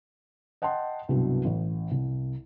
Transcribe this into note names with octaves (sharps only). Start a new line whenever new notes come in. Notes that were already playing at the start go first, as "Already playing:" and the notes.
D#5 F#5 G5 A5 C6
C2 G2 B2 F#3
A1
C2